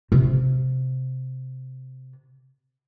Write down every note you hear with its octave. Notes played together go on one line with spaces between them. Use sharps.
C3 D4